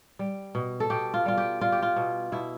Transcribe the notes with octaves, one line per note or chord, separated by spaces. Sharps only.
G3
B2
A4
B2 G4
F4
G3 F4
G4
G3 F4
G4
F4
B2
B2 E4